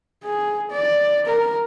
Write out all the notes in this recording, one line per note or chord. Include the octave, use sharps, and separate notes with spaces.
G#4
D5
A#4